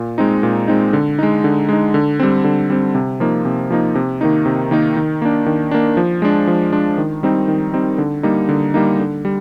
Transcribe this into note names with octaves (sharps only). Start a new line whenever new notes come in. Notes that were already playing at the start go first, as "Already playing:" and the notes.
Already playing: A#2
G#3 C4 D#4
A#2
G#3 C4 D#4
D3
G#3 D#4
D3
G#3 D#4
D3
G3 C4
D3
G3 C4
C3
F3 A#3 D#4
C3
F3 A#3 D#4
C3
D#3 A#3 D#4
C3
D#3 A#3 D#4
D#3
A#3 D4
D#3
A#3 D4
F3
G#3 D4
F3
G#3 D4
D#3
G3 C4 D#4
D#3
G3 C4 D#4
D3
G3 A#3 D#4
D3
G3 A#3 D#4
D3
G3